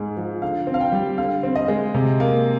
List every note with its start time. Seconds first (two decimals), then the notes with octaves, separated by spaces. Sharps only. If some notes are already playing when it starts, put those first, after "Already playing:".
Already playing: G#2 G#3
0.17 F3
0.42 D3 F5
0.67 C4
0.74 F5
0.81 G5
0.92 G3
1.18 D3 F5
1.43 C4
1.56 D#5
1.68 G#3
1.94 C3
2.20 A#3